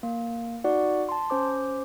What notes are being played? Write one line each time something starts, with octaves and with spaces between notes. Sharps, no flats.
A#3
D#4 F#4 D5 F#5
A5 C6
C#4 C5 D6